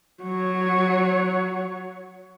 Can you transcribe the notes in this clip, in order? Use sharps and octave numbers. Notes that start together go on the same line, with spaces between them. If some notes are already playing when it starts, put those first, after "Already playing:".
F#3 C#5